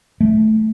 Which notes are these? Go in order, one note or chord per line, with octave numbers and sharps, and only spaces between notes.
A3